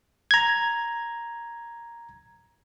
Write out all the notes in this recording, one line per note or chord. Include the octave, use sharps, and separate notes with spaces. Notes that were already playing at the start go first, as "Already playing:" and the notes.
A#5 G#6